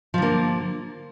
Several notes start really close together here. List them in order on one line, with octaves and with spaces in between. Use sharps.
F3 D3 A#3